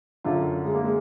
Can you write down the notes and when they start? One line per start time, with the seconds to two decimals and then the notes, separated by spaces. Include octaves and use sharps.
0.24 F#2 D3 F#3 F4
0.64 G#3
0.75 A#3
0.84 G#3